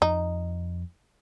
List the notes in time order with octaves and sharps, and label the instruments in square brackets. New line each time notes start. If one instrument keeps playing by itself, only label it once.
[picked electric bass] F2 [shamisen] D#4